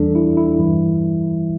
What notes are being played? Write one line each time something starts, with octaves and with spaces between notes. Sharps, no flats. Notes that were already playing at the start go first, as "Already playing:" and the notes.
Already playing: E2 E3 G3 D4 A4
E4
E4
G2 E3 G3